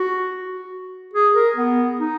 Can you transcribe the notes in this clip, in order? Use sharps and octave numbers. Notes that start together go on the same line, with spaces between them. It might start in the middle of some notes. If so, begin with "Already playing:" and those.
Already playing: F#4
G#4
A#4
B3
D#4